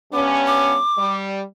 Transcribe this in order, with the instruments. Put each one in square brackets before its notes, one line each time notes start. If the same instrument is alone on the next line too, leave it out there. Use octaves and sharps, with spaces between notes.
[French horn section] G2 B3 C#4 [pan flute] D6
[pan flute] D6
[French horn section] G3